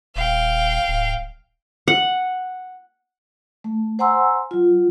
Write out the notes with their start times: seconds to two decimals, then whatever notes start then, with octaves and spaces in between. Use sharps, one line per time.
0.16 D#1 F5 G5
0.88 D1
1.88 F#5
3.64 A3
3.99 C5 F#5 G#5 A#5 C6 E6
4.51 F#3 F4